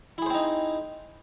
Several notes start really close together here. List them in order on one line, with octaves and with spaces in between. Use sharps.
E4 G#4 C5 C4 D#4